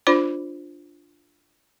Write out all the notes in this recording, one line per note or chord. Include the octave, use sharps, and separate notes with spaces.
D4 F4 C5 D5 B5